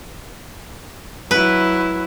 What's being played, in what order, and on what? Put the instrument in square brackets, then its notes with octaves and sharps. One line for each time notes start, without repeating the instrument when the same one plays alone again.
[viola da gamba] F#3 E4 [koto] B4